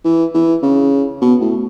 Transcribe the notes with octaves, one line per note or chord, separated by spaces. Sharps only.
E3
E3
C#3
B2
A2